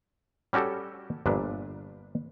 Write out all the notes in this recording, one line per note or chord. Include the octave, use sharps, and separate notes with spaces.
G3 C#4 F#4 G4 A4
G1 A#2 F3 D4 B4